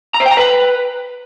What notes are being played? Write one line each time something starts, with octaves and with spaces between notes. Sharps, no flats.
A#5
C5
G5
A#5
B4